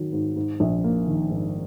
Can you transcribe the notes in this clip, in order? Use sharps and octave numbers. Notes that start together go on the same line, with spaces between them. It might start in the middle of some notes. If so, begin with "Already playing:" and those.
Already playing: D#3 F#3
G#2
G#2
A#1
A#3
D#3
G#2